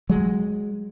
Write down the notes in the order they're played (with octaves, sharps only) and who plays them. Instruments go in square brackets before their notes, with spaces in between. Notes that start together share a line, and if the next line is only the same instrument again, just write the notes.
[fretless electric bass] F#3 G#3